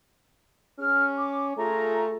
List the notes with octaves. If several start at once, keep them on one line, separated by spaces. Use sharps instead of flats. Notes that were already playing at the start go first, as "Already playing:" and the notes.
C#4 G#4 F6
D6
A3 F4 G#4 A#5